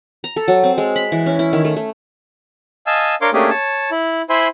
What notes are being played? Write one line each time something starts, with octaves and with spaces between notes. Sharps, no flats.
A#5
A4
F#3
C4
G#3
B5
E3
C#4
E4
D#3
A3
A3
D#5 F5 G#5 A5 E6
D4 A#4 C#5 F5 C6 D6
A3 A#3 C#4 D4 G4 G#4
C#5 A5
E4
E4 C5 E5 G#5 B5 C6